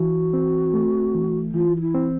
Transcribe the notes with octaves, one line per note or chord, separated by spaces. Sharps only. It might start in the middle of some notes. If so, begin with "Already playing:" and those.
Already playing: E3 F#4
C4
A3
E3
E3 F4
F4
E4
C4